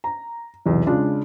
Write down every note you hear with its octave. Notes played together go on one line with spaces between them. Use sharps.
A#5
B1 E2 C3
C#3 G#3 D4 F4